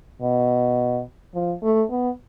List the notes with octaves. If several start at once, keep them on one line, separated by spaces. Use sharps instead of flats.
B2
F3
A3
B3